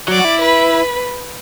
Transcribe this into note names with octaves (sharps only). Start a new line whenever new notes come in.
F#3 D5
F#4
E4
B4